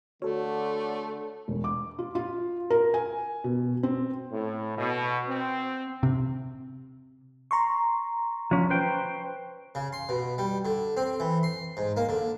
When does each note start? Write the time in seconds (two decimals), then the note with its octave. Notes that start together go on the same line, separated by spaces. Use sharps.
0.22 D3 A3 F#4 A4 C#5
1.48 E1
1.64 D6
1.99 F4
2.15 F4
2.70 A#4
2.94 G#5
3.44 B2
3.83 C4
4.31 A2
4.77 B2
5.28 C4
6.03 C3
7.51 A#5 C6 C#6
8.51 F3 C#4
8.70 B4 C5 G5
9.75 C#3
9.93 C6
10.09 B2
10.38 G3
10.65 D3
10.97 C4
11.20 E3
11.43 C6
11.77 G#2
11.97 A#3
12.09 D3